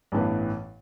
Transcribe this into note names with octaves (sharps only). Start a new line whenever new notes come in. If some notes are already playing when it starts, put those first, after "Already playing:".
A1 G2 E3 B3